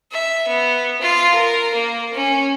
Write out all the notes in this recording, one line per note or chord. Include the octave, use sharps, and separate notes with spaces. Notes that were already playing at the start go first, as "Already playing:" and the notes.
E5
B3
F4
A#4
A#3
C#4